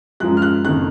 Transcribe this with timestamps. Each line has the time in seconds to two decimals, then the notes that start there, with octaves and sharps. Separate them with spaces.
0.20 F#2 F3 G#3 F#6
0.37 F6
0.42 F#6
0.65 F#1 F2 D#3 F#6